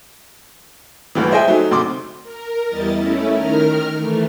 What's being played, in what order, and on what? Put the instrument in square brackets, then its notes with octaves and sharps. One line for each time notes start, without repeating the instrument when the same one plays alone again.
[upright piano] G1 D2 E3
G#4 C5 D#5 E5 G5 G#5
F#3 A3 D#4
D2 C3 C6 D6
[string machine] A#4
E2 G3 E4 D#5 A6
A3 C#4 E4
D#3 A#4 F6
E3 A3